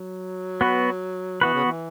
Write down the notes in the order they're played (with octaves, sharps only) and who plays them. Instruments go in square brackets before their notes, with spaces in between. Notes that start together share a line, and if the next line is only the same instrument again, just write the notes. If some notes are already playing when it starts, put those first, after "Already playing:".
Already playing: [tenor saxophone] F#3
[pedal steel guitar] B3 F#4 B4
[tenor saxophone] E3 [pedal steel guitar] B3 F#4 B4
[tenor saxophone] C#3
E3